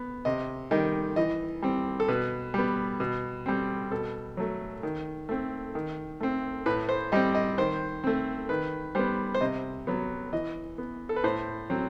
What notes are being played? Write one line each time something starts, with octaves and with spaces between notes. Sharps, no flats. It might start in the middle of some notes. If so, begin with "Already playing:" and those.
Already playing: B3
C3 D#5
D#3 G3 D#5
E3 D#5
G3 C4
A4
B2 B4
G3 B3
B2
G3 C4
B2 A4
F#3 A3
D#3
A3 C4
D#3
A3 C4
A2 B4
C5
G3 C4 D#5
D#5
D#3 C5
A3 C4
D#3 B4
G3 B3 C5
C5
C3 D#5
F#3 B3
E3 D#5
B3
A4
B4
A2 C5
F#3 C4